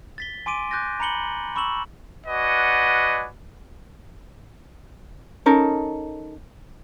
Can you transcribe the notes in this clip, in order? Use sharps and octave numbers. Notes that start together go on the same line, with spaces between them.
A6 B6 G7
G#5 C6 D6 D7 D#7
D6 F#6 G6 A6 A#6
A#5 B5 C#7 F#7 G7
B5 C#6 E6 E7 F#7
F#4 B4 D5 D#5 F#5 G#5
C#4 D#4 A4 A#4